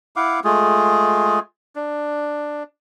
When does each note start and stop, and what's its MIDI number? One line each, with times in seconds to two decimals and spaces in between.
0.16 0.40 64
0.16 0.40 77
0.16 0.40 78
0.16 0.40 86
0.44 1.39 56
0.44 1.39 57
0.44 1.39 65
0.44 1.39 68
1.76 2.63 62